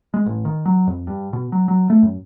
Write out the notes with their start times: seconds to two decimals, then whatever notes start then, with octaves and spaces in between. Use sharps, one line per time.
0.14 G#3
0.26 A1
0.45 D#3
0.66 F#3
0.87 F2
1.07 G2
1.33 B2
1.52 F#3
1.68 F#3
1.90 A3
2.03 F#2